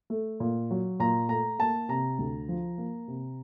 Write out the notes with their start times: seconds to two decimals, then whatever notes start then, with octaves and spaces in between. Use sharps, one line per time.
0.10 A3
0.40 A#2
0.71 F#3
0.99 A#2 A#5
1.29 A3 A#5
1.59 A#3 A5
1.89 C3 A#5
2.19 D2
2.48 F3
2.78 A#3
3.08 C3